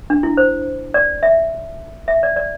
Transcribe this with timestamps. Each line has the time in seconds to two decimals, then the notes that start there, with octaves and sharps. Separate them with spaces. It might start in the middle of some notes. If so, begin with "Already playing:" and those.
0.10 D4
0.23 E4
0.37 C5
0.94 D5
1.23 E5
2.08 E5
2.23 D5
2.36 D5